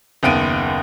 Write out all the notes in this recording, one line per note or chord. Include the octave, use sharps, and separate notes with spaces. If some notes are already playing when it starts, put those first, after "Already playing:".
F#1 D#2 B3 D7 D#7